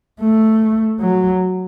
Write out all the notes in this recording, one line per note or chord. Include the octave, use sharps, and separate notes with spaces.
A3
F#3